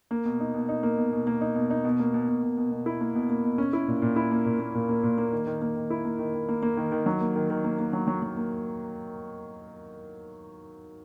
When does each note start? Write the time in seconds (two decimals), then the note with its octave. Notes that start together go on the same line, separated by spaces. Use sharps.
0.11 A#3
0.25 B2
0.40 D#4
0.54 B2
0.69 D#4
0.83 A#3
0.98 B2
1.12 B2
1.27 A#3
1.41 D#4
1.55 B2
1.70 D#4
1.85 B2
1.99 A#3
2.14 B2
2.28 B2
2.42 B2
2.57 B2
2.72 B2
2.86 E4
3.01 A#3
3.15 B2
3.30 A#3
3.44 B2
3.58 C#4
3.73 E4
3.88 A#2
4.02 A#2
4.16 E4
4.31 A#3
4.45 A#2
4.60 A#3
4.75 A#2
4.89 A#3
5.03 A#2
5.18 A#3
5.32 D#3
5.47 D#3
5.62 A#3
5.76 D#3
5.90 E4
6.05 A#3
6.19 D#3
6.34 D#3
6.49 A#3
6.62 A#3
6.77 D#3
6.92 D#3
7.06 F#3
7.21 A#3
7.35 D#3
7.50 D#3
7.64 A#3
7.79 A#3
7.93 F#3
8.08 F#3
8.22 F#3
8.37 A#3